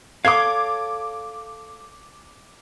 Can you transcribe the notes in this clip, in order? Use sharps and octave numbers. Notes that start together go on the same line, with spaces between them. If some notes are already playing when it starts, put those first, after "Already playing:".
A4 C#5 F5 D6 G#6